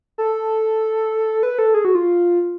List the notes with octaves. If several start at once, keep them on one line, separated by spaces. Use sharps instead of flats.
A4
B4
A4
G#4
F#4
F4